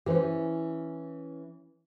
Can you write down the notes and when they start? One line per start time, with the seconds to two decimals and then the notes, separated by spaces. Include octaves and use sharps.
0.06 E3 C#4 G4 B4 C5